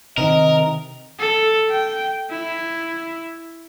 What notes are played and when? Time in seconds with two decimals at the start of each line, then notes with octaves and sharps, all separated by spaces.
0.18 C3 D#3 A#4 D#5
1.19 A4
1.70 G5
2.31 E4